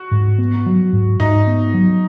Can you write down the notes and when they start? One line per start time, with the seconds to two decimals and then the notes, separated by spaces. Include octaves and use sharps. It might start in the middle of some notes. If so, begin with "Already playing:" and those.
Already playing: F#4
0.11 G#2
0.38 B3
0.66 F#3
0.93 G#2
1.20 G#2 D#4
1.47 B3
1.74 F#3